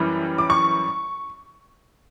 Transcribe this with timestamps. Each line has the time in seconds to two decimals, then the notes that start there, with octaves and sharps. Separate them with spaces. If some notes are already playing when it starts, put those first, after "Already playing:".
Already playing: F#2 E3 G3 C#4
0.38 D6
0.50 C#6